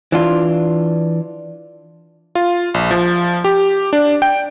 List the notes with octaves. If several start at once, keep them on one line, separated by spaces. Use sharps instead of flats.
E3 D4 F4
F4
A#1
F3
G4
D4
G5